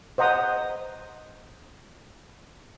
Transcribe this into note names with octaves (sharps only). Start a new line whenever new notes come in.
C5 D#5 F#5 A#5 D#6